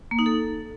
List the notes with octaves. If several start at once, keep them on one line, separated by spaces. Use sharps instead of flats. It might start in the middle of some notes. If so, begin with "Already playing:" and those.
A#3
D#4
A4